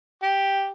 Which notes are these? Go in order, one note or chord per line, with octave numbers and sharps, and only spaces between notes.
G4